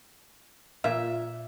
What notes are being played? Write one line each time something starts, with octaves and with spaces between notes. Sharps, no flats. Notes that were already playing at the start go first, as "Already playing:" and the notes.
A#2 F4 E5